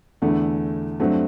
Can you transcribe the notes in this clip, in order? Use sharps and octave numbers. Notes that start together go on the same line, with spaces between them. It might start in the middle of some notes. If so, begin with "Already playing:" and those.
E2 D3 A3 E4
G2 F#3 A3 C4